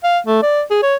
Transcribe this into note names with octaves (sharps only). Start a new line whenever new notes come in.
F5
A3
D5
G#4
C#5